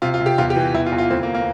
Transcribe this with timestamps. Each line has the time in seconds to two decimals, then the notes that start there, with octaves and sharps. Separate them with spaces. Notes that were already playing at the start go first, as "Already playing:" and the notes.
0.02 C3 F4
0.14 F4
0.20 C3
0.26 G4
0.38 E2 F4
0.50 G4
0.56 E3
0.74 E2 E4
0.86 F4
0.92 E2
0.98 F4
1.10 D2 C4
1.23 A#3
1.34 A#3